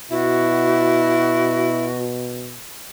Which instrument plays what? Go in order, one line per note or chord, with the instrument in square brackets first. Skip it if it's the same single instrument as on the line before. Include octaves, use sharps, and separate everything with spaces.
[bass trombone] B2 [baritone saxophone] E4 [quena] F#4